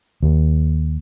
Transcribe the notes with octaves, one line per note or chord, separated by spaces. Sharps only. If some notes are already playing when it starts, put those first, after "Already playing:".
D#2